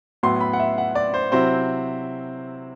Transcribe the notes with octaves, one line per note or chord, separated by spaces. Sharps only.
A2 F#3 B3 E4 C6
B5
F#5
E5
F#5
D5
C5
C3 F#3 C4 E4 C5